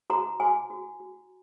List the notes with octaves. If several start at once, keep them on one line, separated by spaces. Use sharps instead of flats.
F#4 A#5
F#4 G#5
F#4
F#4